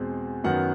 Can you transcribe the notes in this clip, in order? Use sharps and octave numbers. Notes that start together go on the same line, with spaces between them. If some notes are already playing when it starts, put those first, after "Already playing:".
Already playing: E2 B2 G#3 C4
F#2 D#3 F#3 B3 F#5